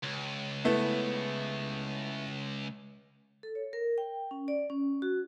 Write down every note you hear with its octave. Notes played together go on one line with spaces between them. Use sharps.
C#2
A3 B3 E4
A4
C#5
A#4
G5
C#4
D5
C#4
F#4